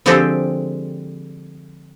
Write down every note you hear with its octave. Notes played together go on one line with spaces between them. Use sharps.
D3 F3 G#3 C4 G4 A4